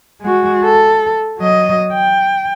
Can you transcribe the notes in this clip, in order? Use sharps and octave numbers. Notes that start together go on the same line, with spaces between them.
G#3 F#4
A4
F#3 D#5
G5